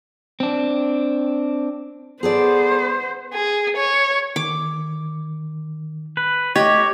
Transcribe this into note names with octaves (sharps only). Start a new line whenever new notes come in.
C4 D4
B3 G#4 A4 C5 D5
G#4
C#5
D#3 D6
B4
A3 G4 C#5 D#5